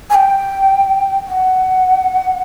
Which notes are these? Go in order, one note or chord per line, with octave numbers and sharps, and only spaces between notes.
G#5
G5
F#5